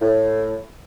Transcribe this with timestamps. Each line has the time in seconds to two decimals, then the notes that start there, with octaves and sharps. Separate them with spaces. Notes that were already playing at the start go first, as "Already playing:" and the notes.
0.02 A2